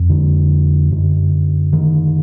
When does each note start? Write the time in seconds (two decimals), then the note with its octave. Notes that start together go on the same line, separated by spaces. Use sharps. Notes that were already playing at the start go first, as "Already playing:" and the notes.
Already playing: F2
0.09 D3
0.91 F#2 D3
1.73 D#3